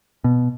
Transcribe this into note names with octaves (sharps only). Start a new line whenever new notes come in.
B2